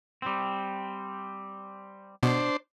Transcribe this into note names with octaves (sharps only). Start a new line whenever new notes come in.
G3 C4
B2 D4 C5